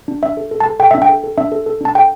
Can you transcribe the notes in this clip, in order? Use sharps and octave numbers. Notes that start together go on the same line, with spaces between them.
D4
D4 E5
A4
A4
A5
A4
A4 G5
D4 E5
G5
A4
A4
D4 E5
A4
A4
D4 A5
A4 G5